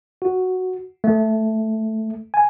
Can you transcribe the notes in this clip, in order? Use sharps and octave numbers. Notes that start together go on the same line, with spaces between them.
F#4
A3
G#5